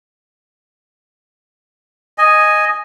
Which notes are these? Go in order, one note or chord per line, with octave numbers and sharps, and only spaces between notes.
D#5 G#5